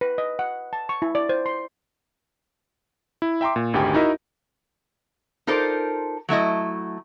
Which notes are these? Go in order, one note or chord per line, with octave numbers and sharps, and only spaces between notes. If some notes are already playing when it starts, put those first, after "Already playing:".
B4
D#5
F#5
A5
C#6
E4
D5
C5
C6
E4
E5 G5 A#5 C6 D6
A#2
G#1 D2 G#2 G4 G5 G#5
D#4 E4 F#4 A#4 D#5 E5
D#4 F4 A4 A#4 C5 D5
F#3 A3 E4 D#5